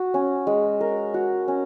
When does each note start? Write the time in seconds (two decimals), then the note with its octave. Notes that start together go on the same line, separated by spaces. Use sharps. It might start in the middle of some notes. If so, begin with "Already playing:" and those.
Already playing: F#4
0.14 C#4
0.47 G#3
0.81 A#4
1.14 F#4
1.48 C#4